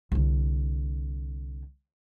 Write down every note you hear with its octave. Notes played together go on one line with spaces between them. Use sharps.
C2 D3